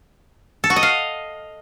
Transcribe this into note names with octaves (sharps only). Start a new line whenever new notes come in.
A4
F#4
D#5
F5